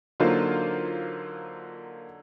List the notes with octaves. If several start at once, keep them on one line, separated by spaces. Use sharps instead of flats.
D3 F#3 A#3 D#4 F4 C5